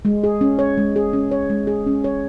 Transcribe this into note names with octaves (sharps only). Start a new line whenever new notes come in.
G#3
G#4
C#4
C#5
G#3
G#4
C#4
C#5
G#3
G#4
C#4
C#5